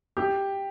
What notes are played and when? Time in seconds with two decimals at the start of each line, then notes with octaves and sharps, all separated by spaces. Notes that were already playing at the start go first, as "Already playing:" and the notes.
0.17 G4